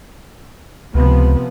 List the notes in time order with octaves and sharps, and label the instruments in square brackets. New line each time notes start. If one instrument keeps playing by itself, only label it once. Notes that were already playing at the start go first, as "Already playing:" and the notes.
[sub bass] C#2 [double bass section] C3 F3 B3